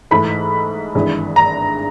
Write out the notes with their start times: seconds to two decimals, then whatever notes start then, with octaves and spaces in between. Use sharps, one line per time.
0.11 G#2 E3 A3 B5
0.95 G#1 G2 E3 G#3
1.36 A#5